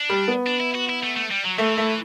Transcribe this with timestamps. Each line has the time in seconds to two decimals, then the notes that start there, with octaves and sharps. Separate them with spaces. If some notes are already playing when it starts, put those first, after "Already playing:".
Already playing: D4
0.10 G3
0.28 B3
0.47 D4
0.60 E4
0.75 F#4
0.89 E4
1.03 A3
1.16 A3
1.31 G3
1.45 F#3
1.58 E3 A3
1.77 A3